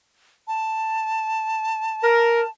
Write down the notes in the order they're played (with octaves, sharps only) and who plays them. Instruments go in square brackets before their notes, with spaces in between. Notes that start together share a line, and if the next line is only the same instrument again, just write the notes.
[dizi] A5
[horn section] A#4